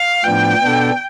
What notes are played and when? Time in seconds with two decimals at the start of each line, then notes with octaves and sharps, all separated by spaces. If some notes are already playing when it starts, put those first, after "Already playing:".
Already playing: F5
0.24 A2 F3 B3 D4 G5
0.62 B2 B3 D4 A4